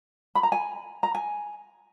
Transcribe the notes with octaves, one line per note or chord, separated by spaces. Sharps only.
B5
A#5
G#5
A#5
G#5